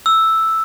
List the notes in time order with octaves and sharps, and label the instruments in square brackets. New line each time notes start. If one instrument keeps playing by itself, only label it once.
[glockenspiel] E6